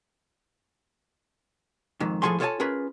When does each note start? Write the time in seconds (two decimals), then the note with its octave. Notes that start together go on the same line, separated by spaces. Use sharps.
2.00 F2 G#2 D#3
2.22 A2 F3 G#4 A4 G#5 C6
2.40 F4 A4 C#5 D#5 G#5 A5
2.60 C#4 F4 G#4 A#4 B4